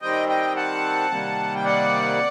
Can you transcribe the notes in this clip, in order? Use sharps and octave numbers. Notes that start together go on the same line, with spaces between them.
D#3 G3 C4 D#5 G5
D#5 G5
F#5 A5
C3 D#3 G3 A#3
G5
D5 F#5